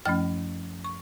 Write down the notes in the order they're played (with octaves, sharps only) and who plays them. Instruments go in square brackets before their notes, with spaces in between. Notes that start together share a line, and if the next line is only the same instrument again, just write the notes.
[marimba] F#2 F3 A3 C#4 F6
C#6